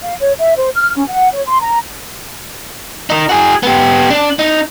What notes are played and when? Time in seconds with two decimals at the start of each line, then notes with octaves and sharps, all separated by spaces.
0.01 F5
0.21 C#5
0.38 E5
0.57 C5
0.75 F6
0.96 C#4
1.07 F#5
1.33 C#5
1.46 C6
1.60 A#5
3.10 D#4 A#4
3.29 F#4 G#4
3.63 B3 G4
4.10 D4
4.39 D#4